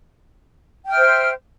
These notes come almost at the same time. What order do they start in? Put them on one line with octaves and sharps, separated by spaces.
G5 F6 E5 C5